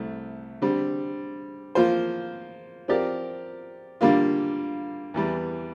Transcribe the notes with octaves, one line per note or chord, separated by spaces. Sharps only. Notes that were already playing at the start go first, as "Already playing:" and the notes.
Already playing: C2 A3
D3 G3 C4
F3 A#3 F4 C5
F3 C4 G4 A#4 D5
D3 G3 A#3 F4
E2 E3 G3